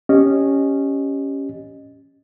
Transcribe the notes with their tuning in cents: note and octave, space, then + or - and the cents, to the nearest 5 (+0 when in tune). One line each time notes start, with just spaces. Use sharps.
C#4 +0 G4 +0 D#5 -15